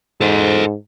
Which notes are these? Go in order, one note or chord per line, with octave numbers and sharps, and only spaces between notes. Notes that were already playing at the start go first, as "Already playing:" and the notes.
G#2 A4 C5